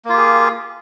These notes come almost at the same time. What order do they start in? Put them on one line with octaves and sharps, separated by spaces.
A#3 F4 G4 G#4